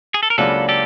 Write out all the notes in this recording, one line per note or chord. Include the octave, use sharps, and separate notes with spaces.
G#4
A4
A#4
C#2 C#3 F#3 A#3 D4 A4 B4
G4 A4